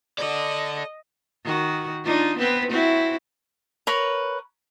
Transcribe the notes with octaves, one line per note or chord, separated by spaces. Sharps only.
A4 D5 D#5
D#3 F#4
D4 D#4 F4
B3 C4 B4
C4 E4 F#4
A#4 B4 C#5